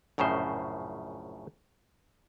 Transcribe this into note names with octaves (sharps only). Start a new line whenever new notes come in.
A#1 F#2 A2 C#3 C5